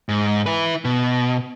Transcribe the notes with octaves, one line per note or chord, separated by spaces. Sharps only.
G#2
E4 B4
B2